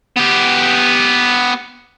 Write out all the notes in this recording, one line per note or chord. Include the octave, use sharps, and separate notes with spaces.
B3 G4